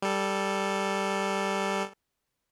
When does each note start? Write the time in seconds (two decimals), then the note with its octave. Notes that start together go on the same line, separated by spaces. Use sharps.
0.02 G3 A4